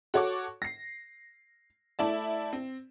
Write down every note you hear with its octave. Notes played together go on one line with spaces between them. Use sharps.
F#4 A4 C#5 C#6 D6
A#6 C7
A3 E4 D5 A5
C4